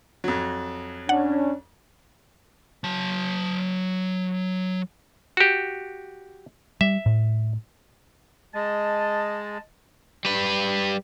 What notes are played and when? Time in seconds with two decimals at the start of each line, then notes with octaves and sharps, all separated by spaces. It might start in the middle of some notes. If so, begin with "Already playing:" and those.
0.24 F2 F#3
1.09 C#4 D4 F#5
2.84 F#3 A5
5.37 F#4 G4
6.81 G3 E5
7.06 A2
8.54 G#3 D#5 A5
10.25 G3 B4